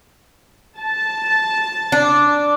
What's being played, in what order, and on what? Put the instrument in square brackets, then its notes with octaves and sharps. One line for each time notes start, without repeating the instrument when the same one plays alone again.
[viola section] A5
[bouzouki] D4